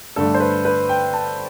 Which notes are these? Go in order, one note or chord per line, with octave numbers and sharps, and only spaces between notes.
G2 D3 A3 D4 A4
C5
B4
B4
G5
A5